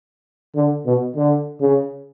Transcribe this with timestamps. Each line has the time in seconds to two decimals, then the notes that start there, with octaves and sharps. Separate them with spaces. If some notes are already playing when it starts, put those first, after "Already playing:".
0.56 D3
0.86 B2
1.16 D3
1.61 C#3